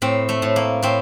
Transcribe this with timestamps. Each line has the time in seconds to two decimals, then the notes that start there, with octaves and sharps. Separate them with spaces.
0.02 A2 C4
0.29 A3
0.42 A2
0.56 A#3
0.83 A2 C4